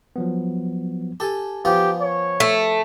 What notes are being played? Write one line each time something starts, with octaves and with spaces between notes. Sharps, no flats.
F3 F#3 B3
G4 A4 G#5 A5
F3 B3 F4 G4
C#5
A3